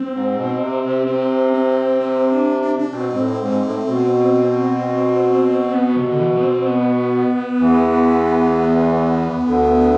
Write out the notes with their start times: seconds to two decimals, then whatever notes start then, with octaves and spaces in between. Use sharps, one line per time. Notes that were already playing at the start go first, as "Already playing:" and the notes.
Already playing: C4
0.14 G#2
0.37 B2
0.60 C3
0.83 C3
1.07 C3 C4
1.53 C4
2.00 C4
2.31 D4
2.62 D4
2.79 D4
2.93 B2 C4
3.09 G#2
3.16 A2
3.40 G#2
3.63 A2
3.86 B2
5.73 B3
5.97 C3
6.11 D3
6.20 E3
6.37 B3
6.43 C4
6.67 B3
7.60 E2 E3
9.47 D2 D3